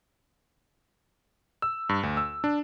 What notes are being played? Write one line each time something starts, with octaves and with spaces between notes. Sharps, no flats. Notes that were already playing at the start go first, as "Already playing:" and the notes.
E6
G2
D2
E6
D4